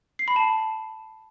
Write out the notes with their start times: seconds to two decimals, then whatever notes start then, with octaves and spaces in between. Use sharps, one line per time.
0.19 C7
0.28 B5
0.36 A5